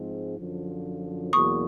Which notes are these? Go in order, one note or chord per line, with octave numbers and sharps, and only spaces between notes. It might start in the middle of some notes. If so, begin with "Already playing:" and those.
Already playing: G#2 F3 G#3 C4
F#2 D3 F3
E2 B2 F#3 A#3 C#6 D#6